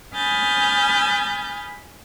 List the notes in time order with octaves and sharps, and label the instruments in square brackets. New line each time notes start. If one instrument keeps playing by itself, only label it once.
[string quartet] G#5 B5 D#6 F6 G6 A6